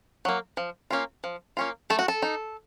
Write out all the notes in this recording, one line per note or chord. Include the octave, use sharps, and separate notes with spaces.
F#3 A#3
F3
A#3 C#4 F4
F3
A#3 C#4 F4
A3 A4
F#4
A4
D#4